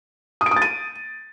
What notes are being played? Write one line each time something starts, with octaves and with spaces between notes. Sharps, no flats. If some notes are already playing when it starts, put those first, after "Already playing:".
D#6
D7
D#6
A6
D#7